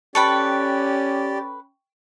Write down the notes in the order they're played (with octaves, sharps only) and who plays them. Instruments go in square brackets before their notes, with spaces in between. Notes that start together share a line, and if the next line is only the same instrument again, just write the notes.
[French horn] C#4 [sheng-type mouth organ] G4 D5 [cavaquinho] A4 B4 B5 [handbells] G5 C#6